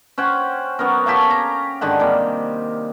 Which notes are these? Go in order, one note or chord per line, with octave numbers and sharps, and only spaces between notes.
C#4 C5 F#5 G5
F#3 B3 C#4 A#4
G4 A4 C#5 F5
A#5
G#2 D3 D#3 F#5
C3 G3 A#3